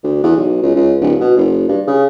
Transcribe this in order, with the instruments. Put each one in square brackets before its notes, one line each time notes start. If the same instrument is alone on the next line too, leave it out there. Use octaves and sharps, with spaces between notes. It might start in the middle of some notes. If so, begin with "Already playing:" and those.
[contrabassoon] D2
E2
B1
C#2
C#2
D1
B2
F#1
G2
C#3